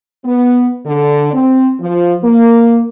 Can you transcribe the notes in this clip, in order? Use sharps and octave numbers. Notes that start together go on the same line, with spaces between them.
B3
D3
C4
F3
A#3